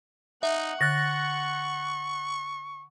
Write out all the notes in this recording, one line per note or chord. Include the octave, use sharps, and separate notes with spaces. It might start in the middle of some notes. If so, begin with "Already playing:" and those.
D#4 E5 F#5
D3 C#6 F#6 A6 A#6